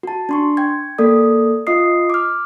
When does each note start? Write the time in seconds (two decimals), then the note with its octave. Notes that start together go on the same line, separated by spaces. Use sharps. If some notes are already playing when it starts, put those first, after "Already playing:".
0.03 F#4 A5
0.29 D4 C6 C#6
0.57 G5 G#6
0.98 A#3 A4 D5 D#6
1.67 F4 D#5 D#6 C7
2.10 D6 F6